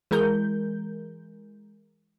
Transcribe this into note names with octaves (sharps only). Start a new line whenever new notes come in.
E3 G#3 A#4 G6